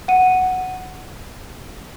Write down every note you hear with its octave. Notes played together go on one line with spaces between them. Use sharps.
F#5 D#7